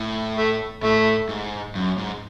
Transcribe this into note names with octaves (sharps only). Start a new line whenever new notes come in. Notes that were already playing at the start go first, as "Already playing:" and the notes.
Already playing: A2
A3
A2 A3
G#2
F#2
G#2